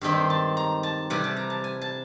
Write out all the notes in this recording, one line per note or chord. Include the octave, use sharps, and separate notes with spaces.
G2 D#3 G#3 C4 D#4 E5
A5
A#5
A5
C3 E3 G3 G#5
A5
A#5
A5
G#5
A5